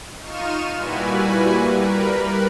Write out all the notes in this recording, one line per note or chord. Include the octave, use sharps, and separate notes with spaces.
D#4 F4 C#6 F6 D#7 E7
A#2 G3 E4 F#4 B4 G#5
G3 A#4 B4